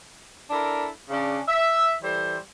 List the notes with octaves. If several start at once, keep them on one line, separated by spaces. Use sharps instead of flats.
D4 E4 A4 A#4
C#3 C#4 D4
E5
E3 G3 A4 C5